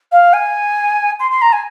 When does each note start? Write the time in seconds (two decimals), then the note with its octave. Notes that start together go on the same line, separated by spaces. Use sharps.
0.12 F5
0.33 G#5
1.19 C6
1.31 C6
1.41 A#5
1.52 G#5